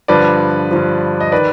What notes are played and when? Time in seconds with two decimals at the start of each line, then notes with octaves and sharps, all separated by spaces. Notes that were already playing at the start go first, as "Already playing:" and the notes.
0.08 G2 D3 F3 B4 D5
0.71 G2 D3 F3
1.20 D#5
1.32 D#3 B4 D5